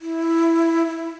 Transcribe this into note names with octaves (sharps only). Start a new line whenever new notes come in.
E4
E4